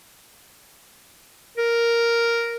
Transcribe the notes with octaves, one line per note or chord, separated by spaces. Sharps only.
A#4